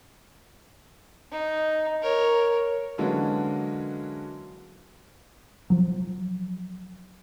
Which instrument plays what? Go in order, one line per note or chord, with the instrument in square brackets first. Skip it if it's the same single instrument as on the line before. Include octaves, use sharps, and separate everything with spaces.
[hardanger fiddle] D#4
A#4 C#5
[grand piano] D3 E3 F#3 G#3 A#3 C#4
[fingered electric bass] F3 F#3